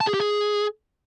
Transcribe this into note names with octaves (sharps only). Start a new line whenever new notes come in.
A5
G#4
G4
G#4